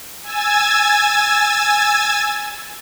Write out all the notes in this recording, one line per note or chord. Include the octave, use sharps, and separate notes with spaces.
G#5 E6 G#6 A6